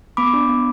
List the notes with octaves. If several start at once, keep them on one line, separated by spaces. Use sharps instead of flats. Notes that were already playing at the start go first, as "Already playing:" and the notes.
B3 B5 D6
D4
B3